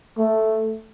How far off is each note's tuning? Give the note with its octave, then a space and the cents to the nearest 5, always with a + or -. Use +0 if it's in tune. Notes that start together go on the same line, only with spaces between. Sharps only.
A3 +0